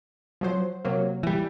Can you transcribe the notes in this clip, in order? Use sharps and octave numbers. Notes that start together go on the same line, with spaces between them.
F3 F#3 C5
C3 F#3 A#3
E3 G3